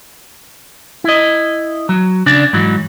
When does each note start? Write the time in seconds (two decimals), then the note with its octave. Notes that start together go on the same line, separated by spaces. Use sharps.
1.04 E4 D#5
1.89 F#3
2.26 C#3 D4 D5
2.53 G#2 E3 F#3